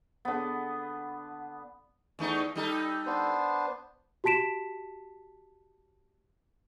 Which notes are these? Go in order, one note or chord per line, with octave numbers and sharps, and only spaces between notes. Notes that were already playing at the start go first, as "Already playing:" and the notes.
D3 B3
E2 A3 D#4
G3 D#4 A4
B3 D4 C5
F#4 G4 A5 B6 D7 E7